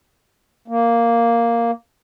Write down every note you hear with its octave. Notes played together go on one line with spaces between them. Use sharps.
A#3